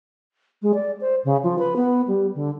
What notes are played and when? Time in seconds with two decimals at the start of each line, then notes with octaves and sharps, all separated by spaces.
0.62 G#3
0.74 D5
1.01 C5
1.24 C#3
1.43 F3
1.59 B4
1.76 B3
2.07 G3
2.35 D3